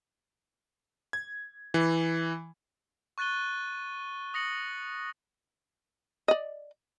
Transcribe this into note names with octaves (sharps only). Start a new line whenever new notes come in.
G#6
E3
C#6 F#6 A6 D#7 G7
D#6 A#6 C#7 F#7
D5 D#5